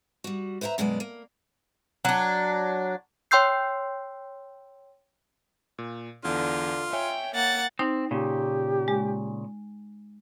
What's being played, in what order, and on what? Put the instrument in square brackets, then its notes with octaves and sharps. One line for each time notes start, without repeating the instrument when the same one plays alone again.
[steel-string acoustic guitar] G3 F#4
B4 C5 E5 F#5 A#5
F#2 B2 G#3 B3 D5
A#3
[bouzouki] F#3 D4
[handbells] C#5 G5 C6 E6 G6 C7
[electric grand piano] A#2
[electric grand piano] E2 [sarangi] D3 [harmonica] F4
[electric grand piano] C#5 E5 G#5 [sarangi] G5
[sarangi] A#3 [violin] F#5 A6
[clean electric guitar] C4 [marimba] D#4
[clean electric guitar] A#2 C#3 [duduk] G4
[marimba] G#3